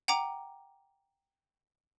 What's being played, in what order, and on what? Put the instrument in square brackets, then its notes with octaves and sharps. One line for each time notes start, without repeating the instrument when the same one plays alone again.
[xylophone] F#5 G5 A#5 D6